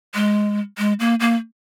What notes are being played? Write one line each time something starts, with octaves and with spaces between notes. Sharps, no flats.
G#3
G#3
A#3
A#3